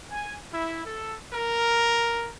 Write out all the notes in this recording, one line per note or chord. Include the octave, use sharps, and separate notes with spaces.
G#5
E4
A4
A#4